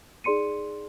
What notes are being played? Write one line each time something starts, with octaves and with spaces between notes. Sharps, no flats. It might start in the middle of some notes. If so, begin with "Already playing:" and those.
D#4 G#4 D5 C6 C#7 D#7